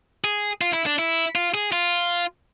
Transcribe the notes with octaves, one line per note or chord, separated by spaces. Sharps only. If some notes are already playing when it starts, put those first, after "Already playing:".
G#4
F4
E4
D4
E4
F4
G#4
F4